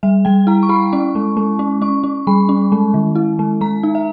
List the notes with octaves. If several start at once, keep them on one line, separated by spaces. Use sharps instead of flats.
G3 E5
G3 G5
E4 A#5
C#6
E4 B5
C#4 C#6
G#3
G#3
C#4
C#4 C#6
C#4
G3 B5
C#4
G#3
D#3
E4
G#3
G#3 A#5
D#4
E5